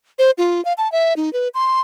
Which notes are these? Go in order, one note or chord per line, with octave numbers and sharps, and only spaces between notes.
C5
F4
F5
A5
E5
D#4
B4
C6